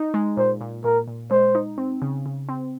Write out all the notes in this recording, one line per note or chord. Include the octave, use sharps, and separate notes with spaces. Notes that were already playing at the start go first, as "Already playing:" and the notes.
Already playing: D#4
G#3
A#2 C5
A#2
A#2 A#4
A#2
G#3 C5
D#4
C4
C#3
C#3
C4